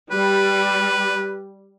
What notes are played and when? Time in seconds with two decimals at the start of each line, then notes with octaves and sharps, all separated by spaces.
0.11 G3 B4